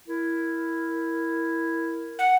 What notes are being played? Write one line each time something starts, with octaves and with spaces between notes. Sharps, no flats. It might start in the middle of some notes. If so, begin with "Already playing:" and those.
E4 A#4
F#5